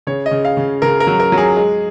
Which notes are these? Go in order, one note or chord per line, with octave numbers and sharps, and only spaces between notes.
C#3 C#5
D#5
C#3
F5
C#3
C#3 A#4
A#4
F#3
A#4
F#3
G#4
G#3